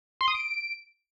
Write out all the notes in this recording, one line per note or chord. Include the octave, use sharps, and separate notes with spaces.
C6
D#6
D7